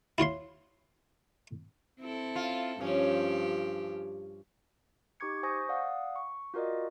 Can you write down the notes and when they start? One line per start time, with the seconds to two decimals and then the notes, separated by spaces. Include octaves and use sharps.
0.18 E4 F4 C#5 C6
2.00 C4 E4 A4
2.36 F4
2.81 G2 F3 C#4 G4
5.20 D#4 G4 C#6 D6 G#6 C#7
5.43 C5 G#5 C#6 D#6 G6 A#6
5.69 D5 F5 F#5 D#6
6.16 C#6
6.54 F4 F#4 A#4 D5 D#5